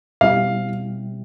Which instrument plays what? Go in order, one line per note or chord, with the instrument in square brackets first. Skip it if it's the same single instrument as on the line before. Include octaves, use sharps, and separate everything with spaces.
[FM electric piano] B2 G3 C4 E4 G4 [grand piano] F5